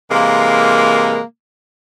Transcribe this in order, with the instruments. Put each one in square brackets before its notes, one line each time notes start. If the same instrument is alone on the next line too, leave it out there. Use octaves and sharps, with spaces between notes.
[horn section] C3 E3 G#3 A#3